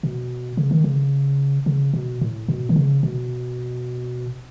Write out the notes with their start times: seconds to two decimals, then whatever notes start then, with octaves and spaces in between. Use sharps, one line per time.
0.03 B2
0.57 C#3
0.71 D#3
0.84 C#3
1.66 C#3
1.94 B2
2.21 A2
2.49 B2
2.69 D#3
2.76 C#3
3.03 B2